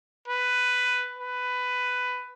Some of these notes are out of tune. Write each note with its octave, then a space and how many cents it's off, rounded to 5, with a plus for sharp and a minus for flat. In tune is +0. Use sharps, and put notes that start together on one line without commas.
B4 +10
B4 +15